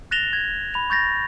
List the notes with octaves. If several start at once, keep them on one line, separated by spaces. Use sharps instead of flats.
F#6 A6 A#6 E7 F7 G7
G#6
B5 F7
C#6 G6 A6 A#6